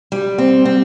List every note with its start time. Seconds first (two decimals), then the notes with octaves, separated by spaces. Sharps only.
0.12 G3
0.38 C4
0.65 C4